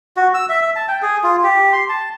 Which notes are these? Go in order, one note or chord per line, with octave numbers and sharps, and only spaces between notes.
F#4
E6
E5
E5
A5
G5
G#4
F4
G4
C6
A5